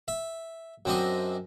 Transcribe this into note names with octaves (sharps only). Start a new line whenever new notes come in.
E5
F#2 C4 D4 D#5